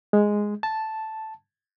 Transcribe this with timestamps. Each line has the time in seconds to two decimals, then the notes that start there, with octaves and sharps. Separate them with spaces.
0.13 G#3
0.63 A5